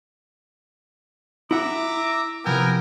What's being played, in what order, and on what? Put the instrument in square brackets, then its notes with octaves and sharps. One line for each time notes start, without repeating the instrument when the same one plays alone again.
[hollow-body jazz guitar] E4 F#5 [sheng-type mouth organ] E5 A#5 [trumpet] D6
[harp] C3 F3 E6 [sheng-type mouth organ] B3 G5 G#5 [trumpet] A#4